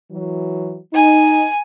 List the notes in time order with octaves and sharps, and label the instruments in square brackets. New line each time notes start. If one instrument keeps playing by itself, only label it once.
[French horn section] E3 F#3
[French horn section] D#4 [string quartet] G#5